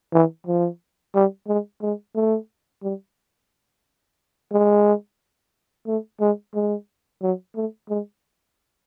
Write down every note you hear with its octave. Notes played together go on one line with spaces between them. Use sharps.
E3
F3
G3
G#3
G#3
A3
G3
G#3
A3
G#3
G#3
F#3
A3
G#3